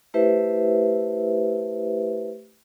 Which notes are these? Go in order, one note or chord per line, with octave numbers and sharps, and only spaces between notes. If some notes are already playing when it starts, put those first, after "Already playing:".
A3 E4 G4 B4 C5 E5